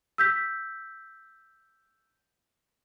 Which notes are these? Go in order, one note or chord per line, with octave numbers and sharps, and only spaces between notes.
E6 G6 B6